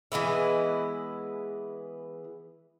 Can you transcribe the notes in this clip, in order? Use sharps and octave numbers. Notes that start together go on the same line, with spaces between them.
E3 G#3 B3 E4